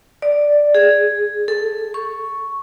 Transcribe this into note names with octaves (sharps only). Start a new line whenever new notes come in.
D5
G#4
A4
C#6